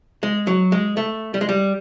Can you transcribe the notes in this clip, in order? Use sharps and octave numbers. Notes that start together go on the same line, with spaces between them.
G#3
F#3
G#3
A3
G3
G#3
G3